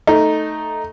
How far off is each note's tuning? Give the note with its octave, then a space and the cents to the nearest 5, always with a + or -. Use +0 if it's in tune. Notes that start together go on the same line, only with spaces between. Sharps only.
A3 +0 D#4 +0